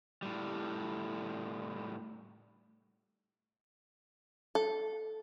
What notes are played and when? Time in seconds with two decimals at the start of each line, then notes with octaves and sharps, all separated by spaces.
0.22 A2 G3
4.55 A4